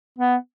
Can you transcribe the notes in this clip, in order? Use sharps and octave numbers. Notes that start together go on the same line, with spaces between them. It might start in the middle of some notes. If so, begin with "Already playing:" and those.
B3